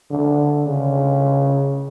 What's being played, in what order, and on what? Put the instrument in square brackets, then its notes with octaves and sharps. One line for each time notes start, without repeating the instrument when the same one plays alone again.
[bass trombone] D3
C#3